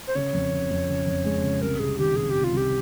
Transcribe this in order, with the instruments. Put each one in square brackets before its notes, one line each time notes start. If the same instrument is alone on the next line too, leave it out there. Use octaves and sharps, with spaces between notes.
[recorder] C5
[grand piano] C#3 [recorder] C#5
[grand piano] F2
C#3
F2
C#3
F2
G#3
C#3
[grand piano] C2 [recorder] A#4
[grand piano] C3 [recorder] G#4
[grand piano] D#3 [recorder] G4
[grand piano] C3 [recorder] G#4
[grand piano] C3 [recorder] G4
[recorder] F4
[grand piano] C2 [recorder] G4